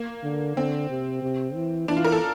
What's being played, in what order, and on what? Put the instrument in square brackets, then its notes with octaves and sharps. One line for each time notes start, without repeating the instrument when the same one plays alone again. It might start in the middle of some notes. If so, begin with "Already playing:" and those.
Already playing: [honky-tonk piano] A#3
[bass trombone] D3
[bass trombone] D3 [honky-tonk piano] C4
[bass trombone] C3
C3
E3
[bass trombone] E3 [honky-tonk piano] D4
[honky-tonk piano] F4
A#4
A4